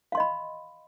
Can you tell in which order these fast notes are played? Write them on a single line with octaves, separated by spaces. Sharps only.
F5 C6 D#5 B5